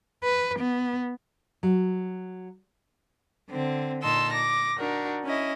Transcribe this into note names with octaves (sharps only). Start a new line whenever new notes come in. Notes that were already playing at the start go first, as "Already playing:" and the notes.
B4
B3
F#3
D3 C4
A#2 D#4 A5 C6 E6
D6 A#6
D4 D#4 F#4 A#4
C#4 E4 D#5